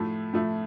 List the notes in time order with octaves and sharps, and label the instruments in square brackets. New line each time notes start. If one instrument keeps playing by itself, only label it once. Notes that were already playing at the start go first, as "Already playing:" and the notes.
Already playing: [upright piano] A2 F3 A3
A2 F3 A3